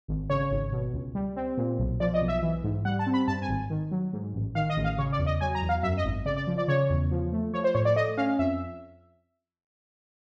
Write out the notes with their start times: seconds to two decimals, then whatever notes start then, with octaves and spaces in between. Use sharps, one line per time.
0.08 G#1
0.30 C#3 C#5
0.51 G#1
0.72 B2
0.93 C#2
1.15 G3
1.36 C4
1.58 A#2
1.79 B1
2.00 F3 D5
2.14 D#5
2.21 B1
2.28 E5
2.42 E3
2.64 G#2
2.85 G3 F#5
2.99 A5
3.07 C4
3.14 B5
3.28 G2 A5
3.42 G#5
3.49 G#1
3.70 D#3
3.91 F#3
4.13 G#2
4.34 A1
4.55 D#3 F5
4.70 D#5
4.77 A1
4.84 F5
4.98 C#3 C#5
5.12 D5
5.19 E2
5.26 D#5
5.41 F#3 G#5
5.55 A#5
5.62 E2
5.69 F5
5.83 F#2 E5
5.97 D#5
6.04 G#1
6.26 C#3 D5
6.37 D5
6.47 F3
6.58 D5
6.68 C#3 C#5
6.90 E2
7.11 F3
7.32 A3
7.54 F3 C#5
7.64 C5
7.75 A2 C#5
7.85 D5
7.96 A3 D#5
8.17 C#4 F5
8.39 F2 E5